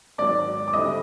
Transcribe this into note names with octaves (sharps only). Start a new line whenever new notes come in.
G#2 D#3 F#3 D5 D6
D6
D3 G3 C4 E4 D#5 D#6